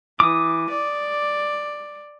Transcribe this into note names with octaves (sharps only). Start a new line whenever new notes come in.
E3 D6 D#6
D5